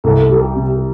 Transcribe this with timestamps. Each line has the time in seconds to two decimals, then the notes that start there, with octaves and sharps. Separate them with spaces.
0.04 C2 A4
0.29 G3
0.42 G4
0.56 C3